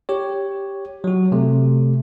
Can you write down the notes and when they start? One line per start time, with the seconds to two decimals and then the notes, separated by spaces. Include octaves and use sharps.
0.09 G4 C#5
1.04 F#3 F#4
1.32 C3 A3